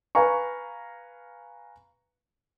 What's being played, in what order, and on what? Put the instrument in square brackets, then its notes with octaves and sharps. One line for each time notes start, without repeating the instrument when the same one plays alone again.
[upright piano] B4 F5 G#5 A#5 C#6